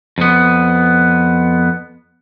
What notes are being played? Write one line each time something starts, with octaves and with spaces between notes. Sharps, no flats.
F2 B3